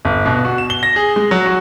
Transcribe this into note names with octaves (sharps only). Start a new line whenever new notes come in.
G1
B2
F#4
E7
G7
A#6
G#4
G#3
F#3
F#4